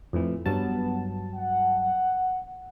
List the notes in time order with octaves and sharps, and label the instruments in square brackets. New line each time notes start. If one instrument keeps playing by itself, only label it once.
[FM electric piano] F2 A2 E3
[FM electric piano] G2 F#3 A5 [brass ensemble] B3
[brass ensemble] F#5